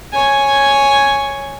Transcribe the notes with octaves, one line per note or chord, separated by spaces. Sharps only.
C#5 G#5